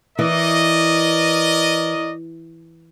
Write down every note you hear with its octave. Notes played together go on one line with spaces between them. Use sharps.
E3 A#4 D5 D#5